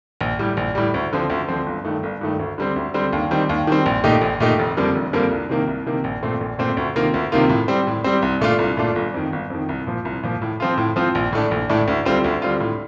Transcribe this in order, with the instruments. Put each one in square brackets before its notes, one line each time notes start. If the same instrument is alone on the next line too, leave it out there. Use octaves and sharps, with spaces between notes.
[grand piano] A#1
A2 G3
A#1
A2 G3
D2
D3 F3 C4
D2
D3 F3 C4
G1
G2 D#3 A3
G1
G2 D#3 A3
D2
D3 G3 C4
D2
D3 G3 C4
D#2
D#3 G3 C4
D#2
D#3 G3 C4
A#1
A#2 A3 D#4 G4
A#1
A#2 A3 D#4 G4
F1
F2 D3 G3 A#3
F1
F2 D3 G3 A#3
C2
C3 D#3 A#3
C2
C3 D#3 A#3
A#1
A#2 A3 C4
A#1
A#2 A3 C4
D2
C3 D#3 A#3 F4
D2
C3 D#3 A#3 F4
A2
G3 C4
A2
G3 C4
C2
A#2 A3 D4 F4
C2
A#2 A3 D4 F4
G1
F2 D#3
G1
F2 D#3
C2
A#2 F3
C2
A#2 F3
A2
F3 C4 F4
A2
F3 C4 F4
A#1
A2 A3 D4
A#1
A2 A3 D4
D2
D3 G3 C4 F4
D2
D3 G3 C4 F4
A2